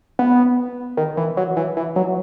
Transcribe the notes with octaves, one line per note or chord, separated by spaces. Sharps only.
B3
D#3
E3
F#3
E3
E3
F#3